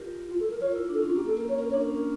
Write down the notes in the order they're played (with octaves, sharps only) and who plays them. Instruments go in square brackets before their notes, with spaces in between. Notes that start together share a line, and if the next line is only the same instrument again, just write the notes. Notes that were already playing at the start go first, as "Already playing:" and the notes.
Already playing: [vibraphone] F4 G4 A#4
[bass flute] F4
A4
A#4
[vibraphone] F4 [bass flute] C#5
[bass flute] A#4
[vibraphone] E4
D4
[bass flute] A4
[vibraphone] C#4 [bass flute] F4
[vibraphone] A#3 [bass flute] G4
[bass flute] A4
[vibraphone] A#3
[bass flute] A#4
C#5
[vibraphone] C#4 [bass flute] A#4
[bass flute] C#5
[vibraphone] D4
[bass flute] A#4
[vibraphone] C#4
[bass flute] A#4